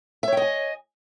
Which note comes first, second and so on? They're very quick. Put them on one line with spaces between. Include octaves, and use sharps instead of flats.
E5 C#5 G5 D#5 G#5